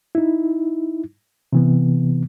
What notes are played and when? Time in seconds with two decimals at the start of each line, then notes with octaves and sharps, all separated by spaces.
0.15 D#4 E4
1.53 C3 E3 B3